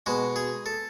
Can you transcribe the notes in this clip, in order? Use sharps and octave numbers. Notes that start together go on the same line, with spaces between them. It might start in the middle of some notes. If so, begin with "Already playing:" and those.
B2 G#3 F#4
G#4
A4